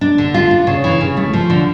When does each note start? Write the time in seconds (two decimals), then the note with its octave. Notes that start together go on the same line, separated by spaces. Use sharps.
0.01 D4
0.18 D3
0.34 F4
0.51 D4
0.67 C#3
0.84 E3
1.01 C#3
1.17 A3
1.33 F3
1.50 D3